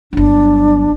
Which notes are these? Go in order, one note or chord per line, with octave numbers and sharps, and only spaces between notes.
G1 F#3 D4